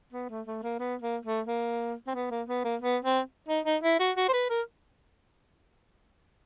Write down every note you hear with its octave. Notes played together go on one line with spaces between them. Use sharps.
B3
A3
A3
A#3
B3
A#3
A3
A#3
C4
B3
A#3
B3
A#3
B3
C4
D#4
D#4
E4
F#4
F#4
C5
B4
A#4